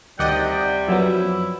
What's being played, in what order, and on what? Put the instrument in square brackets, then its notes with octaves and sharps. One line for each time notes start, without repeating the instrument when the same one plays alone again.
[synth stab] D2 D#3 D#5 [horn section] C3 G3 [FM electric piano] D5 F#5 [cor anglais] G5
[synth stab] F#2 [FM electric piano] F3 F#3 B3 [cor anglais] E4